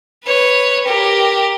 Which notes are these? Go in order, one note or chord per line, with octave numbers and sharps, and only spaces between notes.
B4 C#5
G4 A#4